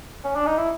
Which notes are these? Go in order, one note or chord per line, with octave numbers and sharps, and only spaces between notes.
C#4
D4
D#4
E4